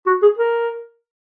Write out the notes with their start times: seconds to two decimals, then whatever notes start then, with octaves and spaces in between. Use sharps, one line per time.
0.07 F#4
0.22 G#4
0.38 A#4